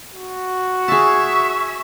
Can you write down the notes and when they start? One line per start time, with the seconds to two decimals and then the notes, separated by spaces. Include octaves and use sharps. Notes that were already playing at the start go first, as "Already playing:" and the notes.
0.12 F#4
0.88 G#4 E5 A5 C#6